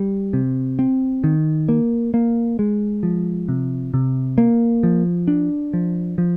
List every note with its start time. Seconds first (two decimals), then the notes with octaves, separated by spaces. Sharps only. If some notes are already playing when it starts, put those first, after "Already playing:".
Already playing: G3
0.33 C3
0.79 C4
1.24 D#3
1.69 A#3
2.14 A#3
2.59 G#3
3.03 F3
3.49 C3
3.94 C3
4.38 A#3
4.83 F3
5.28 D4
5.73 F3
6.18 F3